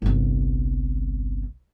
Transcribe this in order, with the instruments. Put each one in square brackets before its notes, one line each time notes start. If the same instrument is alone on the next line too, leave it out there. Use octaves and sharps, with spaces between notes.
[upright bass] G1 C2